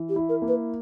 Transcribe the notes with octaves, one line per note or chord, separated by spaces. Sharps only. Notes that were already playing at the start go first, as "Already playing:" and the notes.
Already playing: E3
G4
E4
A#4
A#3
B4